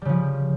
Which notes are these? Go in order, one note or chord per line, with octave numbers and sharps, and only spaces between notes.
C#3 F3 G3